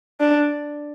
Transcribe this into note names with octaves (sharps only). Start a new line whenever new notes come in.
D4